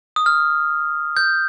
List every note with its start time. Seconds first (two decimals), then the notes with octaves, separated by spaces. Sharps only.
0.16 D#6
0.26 F6
1.17 G6